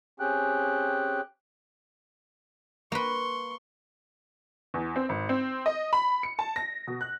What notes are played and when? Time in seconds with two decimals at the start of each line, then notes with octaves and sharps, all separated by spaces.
0.20 C4 C#4 G4 G#4 G5 F#6
2.92 A#3 B4 C6 C#6
4.74 E2
4.96 C4
5.09 G#1
5.29 C4
5.66 D#5
5.93 B5
6.23 C#7
6.39 A5
6.56 A#6
6.87 B2
7.01 F#6